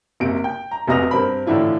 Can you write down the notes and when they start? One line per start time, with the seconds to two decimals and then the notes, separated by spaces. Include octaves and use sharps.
0.20 F#1 C3 D7
0.44 G5
0.71 A#5
0.87 F1 C3 F#4 D#5 A#6 F7
1.11 G2 C4 A#4 B5
1.47 A2 D3 E3 D4 E4 F4